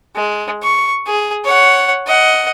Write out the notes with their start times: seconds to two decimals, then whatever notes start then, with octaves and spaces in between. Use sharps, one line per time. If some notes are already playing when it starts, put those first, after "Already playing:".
0.16 G#3
0.63 C#6
1.07 G#4
1.45 C#5 F#5
2.07 D#5 F#5